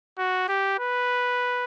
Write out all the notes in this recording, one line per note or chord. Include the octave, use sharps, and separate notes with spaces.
F#4
G4
B4